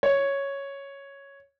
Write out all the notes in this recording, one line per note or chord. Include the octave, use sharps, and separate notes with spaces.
C#5